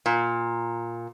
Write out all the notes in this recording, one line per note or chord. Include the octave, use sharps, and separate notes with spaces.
A#2